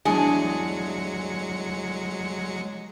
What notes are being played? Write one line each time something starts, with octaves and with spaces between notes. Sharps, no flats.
E2 F#3 G#3 D4 G#4 C#7